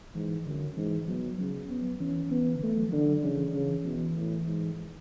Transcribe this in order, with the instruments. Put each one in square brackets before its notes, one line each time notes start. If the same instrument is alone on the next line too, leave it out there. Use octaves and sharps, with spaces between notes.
[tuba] G#2 [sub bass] E3
[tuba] F#2 [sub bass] D3
[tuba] G#2 [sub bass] E3
[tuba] B2 [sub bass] F#3
[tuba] C#3 [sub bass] F#3
[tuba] B3
[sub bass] E3 [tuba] C#4
[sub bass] E3 [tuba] B3
[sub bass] D3
[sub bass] E3 [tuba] A3
[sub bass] F#3
F#3
[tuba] D3 [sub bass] E3
[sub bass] F#3
[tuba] C#3 [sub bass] E3
[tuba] C#3 [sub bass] E3
[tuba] B2 [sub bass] E3
[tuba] A2
G#2